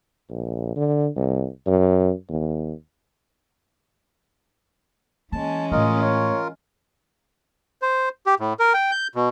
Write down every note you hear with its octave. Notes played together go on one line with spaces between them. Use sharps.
A#1
D3
C2
F#2
D#2
E3 G#3 A#3 C#4 A5
A2 A3 F4 A#4 D#5
C#5
C5
G4
A2
A#4
G5
G6
B2